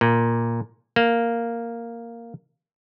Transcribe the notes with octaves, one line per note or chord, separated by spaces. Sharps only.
A#2
A#3